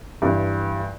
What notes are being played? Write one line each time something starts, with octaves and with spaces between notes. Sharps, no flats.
G2 E3